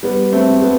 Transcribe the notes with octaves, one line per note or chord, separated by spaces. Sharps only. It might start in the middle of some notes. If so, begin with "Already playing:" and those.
G3 B3
A3 C4
G3 B3